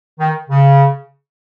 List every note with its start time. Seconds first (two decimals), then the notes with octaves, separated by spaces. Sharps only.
0.20 D#3
0.49 C#3